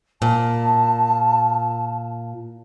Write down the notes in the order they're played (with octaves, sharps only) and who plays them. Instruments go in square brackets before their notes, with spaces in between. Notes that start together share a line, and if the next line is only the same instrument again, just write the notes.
[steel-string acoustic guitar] A#2 [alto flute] A5